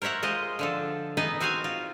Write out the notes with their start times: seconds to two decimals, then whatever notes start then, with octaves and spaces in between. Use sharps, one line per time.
0.02 A#4 C5 C#5 E5 F#5
0.23 G#3 F4 C5 D#5
0.59 D3 F3 A4
1.17 E3 B3 D#4 G#4 B4 D#5
1.40 C4 F#4 C5 F5 F#5 G#5
1.64 F4